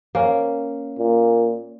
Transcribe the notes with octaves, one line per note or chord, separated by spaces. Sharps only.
A#3 C#4
A#2